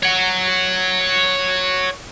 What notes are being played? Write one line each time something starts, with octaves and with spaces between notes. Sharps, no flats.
C#5 F#5